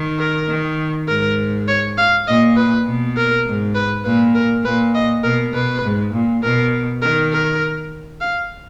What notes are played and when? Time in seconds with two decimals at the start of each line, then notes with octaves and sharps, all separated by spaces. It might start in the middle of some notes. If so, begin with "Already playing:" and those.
Already playing: D#3
0.19 A#4
0.48 D#3
1.08 G#2 A#4
1.68 C#5
1.98 F5
2.27 A#2 D#5
2.56 B4
2.86 B2
3.16 A#4
3.46 G#2
3.75 B4
4.04 A#2 B4
4.35 A#4
4.64 A#2 B4
4.95 D#5
5.23 B2 A#4
5.54 B2 B4
5.83 G#2
6.13 A#2
6.42 B2 A#4
7.02 D#3 A#4
7.32 A#4
8.21 F5